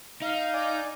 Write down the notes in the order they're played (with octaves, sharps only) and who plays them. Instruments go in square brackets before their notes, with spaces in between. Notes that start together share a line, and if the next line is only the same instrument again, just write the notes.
[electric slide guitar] D#4 [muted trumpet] F5
[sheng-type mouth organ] D5 G#5 D6